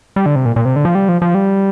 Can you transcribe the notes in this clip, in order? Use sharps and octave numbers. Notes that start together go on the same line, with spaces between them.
G3
D3
C3
A#2
A#2
C3
D3
F3
G3
F3
F3
G3